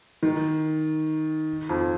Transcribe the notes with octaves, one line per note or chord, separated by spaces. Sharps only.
D#3
F2 F3